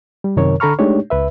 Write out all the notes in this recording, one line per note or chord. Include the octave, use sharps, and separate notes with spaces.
G3
F#2 C3 D#3 A#4 C#5
D3 A4 A#5 B5 C#6 F6
G#3 A3 D4 D#4 G4 C#5
C#2 B4 E5